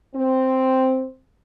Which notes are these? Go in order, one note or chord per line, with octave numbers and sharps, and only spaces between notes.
C4